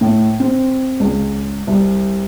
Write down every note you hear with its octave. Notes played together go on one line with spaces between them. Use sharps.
A2
C4
C#2
C2